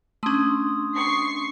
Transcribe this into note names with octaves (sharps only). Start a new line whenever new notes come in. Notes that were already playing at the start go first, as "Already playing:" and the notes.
A3 C#4 D4 C6 D#6
C#6 C7